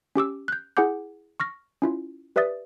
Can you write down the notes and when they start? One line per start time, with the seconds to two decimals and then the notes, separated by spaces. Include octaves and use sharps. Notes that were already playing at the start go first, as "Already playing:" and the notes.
0.16 C#4 G4 D6 E6
0.48 F#6 G6
0.77 E4 G#4 F#5 G#5 D6 G6
1.40 C#6 F6 A#6
1.82 C#4 E4 F4
2.36 G4 B4 D5 E5 D#6 A6